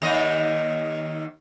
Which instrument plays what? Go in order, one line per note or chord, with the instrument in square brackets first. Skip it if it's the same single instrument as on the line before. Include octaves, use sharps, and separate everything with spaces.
[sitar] D#2 D#3 D#5